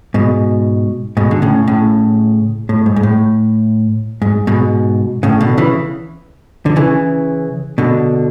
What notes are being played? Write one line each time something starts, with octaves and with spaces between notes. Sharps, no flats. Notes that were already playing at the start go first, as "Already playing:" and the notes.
G#2 B2
G#2 B2
D3
A2 C#3
A2 C#3
A2
G#2
G#2
A2
G#2
G#2 B2
A2 C#3
B2 D3
C#3 E3
D3
C#3 E3
B2 D3